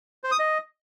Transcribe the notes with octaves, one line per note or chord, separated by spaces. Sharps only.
C5
D#6
D#5